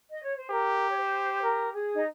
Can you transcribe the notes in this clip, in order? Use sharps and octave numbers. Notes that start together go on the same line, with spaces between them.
D#5
C#5
C5
G4 A#4
C#5
C5
A#4
G#4
D#4